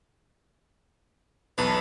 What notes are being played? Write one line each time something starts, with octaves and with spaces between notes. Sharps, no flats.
B1 E2 B4 A5